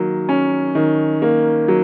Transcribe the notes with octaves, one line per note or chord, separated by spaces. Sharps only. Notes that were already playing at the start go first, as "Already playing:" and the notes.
Already playing: D#3 F#3 A#3
C#4
D#3
A#3
F#3